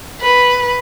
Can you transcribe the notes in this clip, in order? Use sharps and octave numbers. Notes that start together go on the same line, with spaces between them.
B4